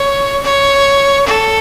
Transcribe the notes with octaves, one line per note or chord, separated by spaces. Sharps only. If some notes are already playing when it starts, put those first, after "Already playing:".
Already playing: C#5
C#5
A4